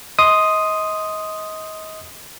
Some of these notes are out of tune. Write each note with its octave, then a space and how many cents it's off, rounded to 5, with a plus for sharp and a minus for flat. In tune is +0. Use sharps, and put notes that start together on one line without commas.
D#5 +30 C6 +0 D#6 +0